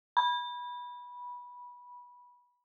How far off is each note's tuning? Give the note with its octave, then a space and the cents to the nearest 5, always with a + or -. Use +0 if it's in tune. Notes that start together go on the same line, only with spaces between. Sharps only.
B5 -15